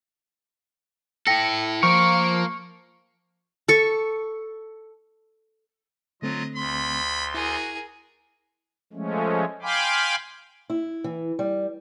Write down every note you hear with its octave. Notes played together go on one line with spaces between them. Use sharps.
E4 A4 G5 A#6 C#7
F3 A#3 A#4 C#6
A4 C#6
D3 F#3 A3 C4 F4 D#5
D2 B5 C6
E4 F#4 G#4 A#4
F3 G#3 A3 C#4
F5 G5 G#5 B5 C6 D6
E4
E3
G3